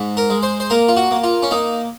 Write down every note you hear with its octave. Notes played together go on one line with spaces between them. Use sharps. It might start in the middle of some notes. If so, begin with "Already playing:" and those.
Already playing: G#2
A#4
G#3
C5
C5
A#3 A#4
F4
F#4
A#3
F4
C#4
A#3 D#4